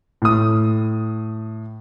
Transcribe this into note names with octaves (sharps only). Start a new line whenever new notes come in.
A2 D#6